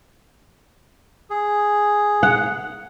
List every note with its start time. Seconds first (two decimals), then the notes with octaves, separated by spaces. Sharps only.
1.30 G#4
2.23 F#5